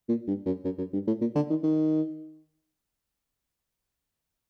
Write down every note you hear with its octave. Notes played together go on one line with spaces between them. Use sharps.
A#2
G2
F#2
F#2
F#2
G2
A2
A#2
D3
D#3
D#3